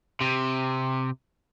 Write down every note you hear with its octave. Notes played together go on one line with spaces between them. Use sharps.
C3